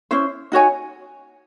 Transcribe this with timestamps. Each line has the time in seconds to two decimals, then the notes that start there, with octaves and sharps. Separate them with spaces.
0.11 C#4 E4 C5 E5
0.52 D#4 F#4 C#5 G#5